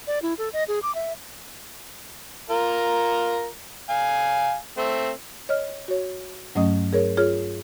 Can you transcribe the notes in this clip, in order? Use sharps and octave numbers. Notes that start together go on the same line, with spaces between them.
D5
E4
A4
D#5
G#4
D6
E5
F4 A#4 A#5
F5 G#5
A3 C4
C#5 D#5 F6
F#4 C#5
G2 F#3 A3 C#4 D#5 D#6
G#4 A#4 C#5
F4 G#4 C#5 F6